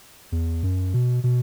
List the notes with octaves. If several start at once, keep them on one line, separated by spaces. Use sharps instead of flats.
E2
F#2
B2
B2